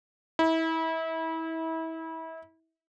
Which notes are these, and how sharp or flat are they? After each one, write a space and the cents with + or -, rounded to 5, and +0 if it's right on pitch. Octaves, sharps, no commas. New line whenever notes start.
E4 -30